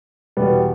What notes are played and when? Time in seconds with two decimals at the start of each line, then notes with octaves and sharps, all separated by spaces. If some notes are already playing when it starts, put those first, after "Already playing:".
0.37 E2 B2 G3 B3